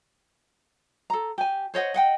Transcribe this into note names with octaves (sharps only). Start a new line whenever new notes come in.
A4 A#5
G4 G#5
C5 C#5 D#5 F#5
D#5 F#5 G5